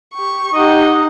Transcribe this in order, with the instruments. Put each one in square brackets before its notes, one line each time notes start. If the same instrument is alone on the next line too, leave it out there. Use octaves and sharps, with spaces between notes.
[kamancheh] G4 C#6
[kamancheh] D#4 F#5 [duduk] G4 [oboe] D#5